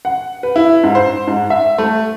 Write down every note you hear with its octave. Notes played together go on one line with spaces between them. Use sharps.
F#5
B4
E4
G#2
C5
G#2
E5
A3